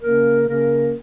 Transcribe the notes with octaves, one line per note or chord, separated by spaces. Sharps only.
C#3 A#3 C#4 A#4
C#3 A#3 C#4 A#4